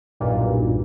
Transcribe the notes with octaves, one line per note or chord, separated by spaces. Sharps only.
B1 E2 G2 A#2